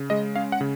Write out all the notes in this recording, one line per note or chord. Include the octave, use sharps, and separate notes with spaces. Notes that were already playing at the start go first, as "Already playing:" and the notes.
Already playing: C#3
G#3 D#5
C#4 F5
F#5
C#3